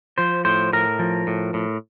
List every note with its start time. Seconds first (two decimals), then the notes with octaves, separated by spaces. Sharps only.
0.18 F3 C5
0.45 A2 C5
0.73 A2 A#4
0.99 F3
1.27 A2
1.54 A2